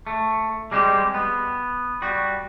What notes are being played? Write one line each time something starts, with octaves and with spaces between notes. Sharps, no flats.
A3
G3 G#3 C4 F#4 G4
B3
G3 F#4